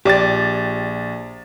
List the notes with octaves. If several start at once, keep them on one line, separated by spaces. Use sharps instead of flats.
A#1 G4 D5 A6